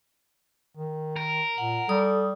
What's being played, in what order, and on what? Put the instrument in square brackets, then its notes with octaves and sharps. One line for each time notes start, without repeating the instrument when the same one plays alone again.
[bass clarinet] D#3
[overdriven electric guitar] A#4
[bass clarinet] A#2 [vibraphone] F#5
[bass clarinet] G3 [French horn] A4 [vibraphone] D#6